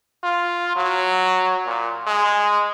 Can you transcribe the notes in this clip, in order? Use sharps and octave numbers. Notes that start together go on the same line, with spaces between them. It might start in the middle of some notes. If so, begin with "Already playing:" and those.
F4
F#3
A#2
G#3